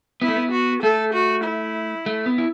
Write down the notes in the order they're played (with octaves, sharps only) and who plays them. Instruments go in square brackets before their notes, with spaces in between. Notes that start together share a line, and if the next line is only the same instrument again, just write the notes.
[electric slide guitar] B3 [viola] E4
[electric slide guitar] A3
B3
[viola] F#4
[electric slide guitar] A3 [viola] A4
[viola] F#4
E4
[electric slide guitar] A3
B3
E4